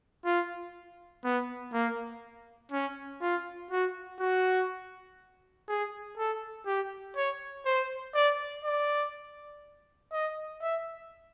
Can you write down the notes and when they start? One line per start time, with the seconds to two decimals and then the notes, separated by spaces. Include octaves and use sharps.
0.25 F4
1.24 B3
1.73 A#3
2.72 C#4
3.21 F4
3.71 F#4
4.19 F#4
5.69 G#4
6.18 A4
6.66 G4
7.16 C#5
7.65 C5
8.15 D5
8.64 D5
10.12 D#5
10.62 E5